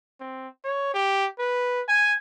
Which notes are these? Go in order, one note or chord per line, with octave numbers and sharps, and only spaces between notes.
C4
C#5
G4
B4
G#5